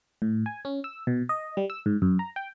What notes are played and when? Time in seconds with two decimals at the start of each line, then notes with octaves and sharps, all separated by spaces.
0.22 A2
0.46 G#5
0.65 C#4
0.84 E6
1.07 B2
1.29 D#5
1.57 G3
1.70 E6
1.86 G#2
2.02 F#2
2.19 A#5
2.36 G5